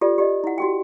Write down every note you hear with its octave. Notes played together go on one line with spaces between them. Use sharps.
F4 G4 A4 D5
G4 D5 D#5
E4 F#5
F#4 G4 G5